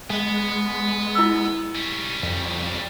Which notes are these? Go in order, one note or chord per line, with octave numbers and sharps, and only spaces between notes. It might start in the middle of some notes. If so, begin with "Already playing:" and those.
G#3 B3
E4 E6
G3 C#4
F2